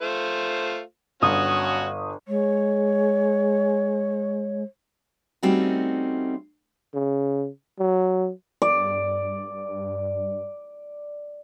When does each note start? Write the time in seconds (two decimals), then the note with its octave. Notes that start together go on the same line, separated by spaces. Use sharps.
0.01 A3 F4 C5
1.22 G1 C#4 F#4 D#6
2.28 G#3 C#5
5.43 G3 A3 C4 C#4 D#4 F#4
6.94 C#3
7.79 F#3
8.62 G2 D5